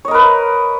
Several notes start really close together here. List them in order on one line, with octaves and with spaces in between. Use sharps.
C#5 D#5 A#4 B4